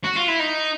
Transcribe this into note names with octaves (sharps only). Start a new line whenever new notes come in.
F#4
F4
E4
D#4